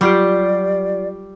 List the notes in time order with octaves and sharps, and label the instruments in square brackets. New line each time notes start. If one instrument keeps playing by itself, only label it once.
[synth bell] F#3 F4 G4 [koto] G3 [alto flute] D5